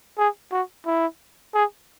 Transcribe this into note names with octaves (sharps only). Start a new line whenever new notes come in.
G#4
F#4
E4
G#4